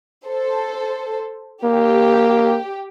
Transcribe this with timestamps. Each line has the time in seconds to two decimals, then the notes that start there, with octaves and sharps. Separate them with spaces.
0.27 A4 C5
1.64 A#3 G4